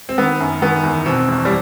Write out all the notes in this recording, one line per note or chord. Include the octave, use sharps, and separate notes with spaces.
C4
D#3 B3
F#2
D#3 B3
E2
B2 C4
E2
G3